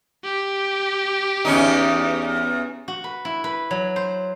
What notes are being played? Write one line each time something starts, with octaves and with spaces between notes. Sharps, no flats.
G4
E2 C#4 D#4
F#4
B4
E4
B4
F#3
C5